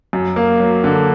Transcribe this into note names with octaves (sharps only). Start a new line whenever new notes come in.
F#2
A#3
F#3
D3